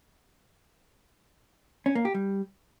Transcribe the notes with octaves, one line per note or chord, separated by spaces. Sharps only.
C#4
A#3
G4
G3